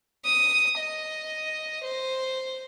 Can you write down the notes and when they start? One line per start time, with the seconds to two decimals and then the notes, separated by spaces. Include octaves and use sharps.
0.26 D#6
0.80 D#5
1.84 C5